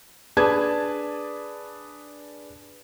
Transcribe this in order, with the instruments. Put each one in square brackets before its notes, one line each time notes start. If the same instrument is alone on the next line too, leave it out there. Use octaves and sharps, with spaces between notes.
[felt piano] D4 G#4 B4 A5 G#6